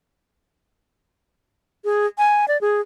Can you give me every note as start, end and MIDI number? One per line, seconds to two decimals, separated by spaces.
1.85 2.06 68
2.18 2.45 80
2.48 2.60 74
2.61 2.81 68